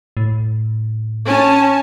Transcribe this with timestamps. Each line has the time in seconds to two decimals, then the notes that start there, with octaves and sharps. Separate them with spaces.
0.17 A2
1.26 C#4 G#5 A5